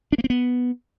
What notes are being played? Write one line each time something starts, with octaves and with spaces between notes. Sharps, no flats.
D4
A#3
C4
B3